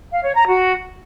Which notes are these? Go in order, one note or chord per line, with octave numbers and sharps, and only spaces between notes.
F5
C#5
A#5
F#4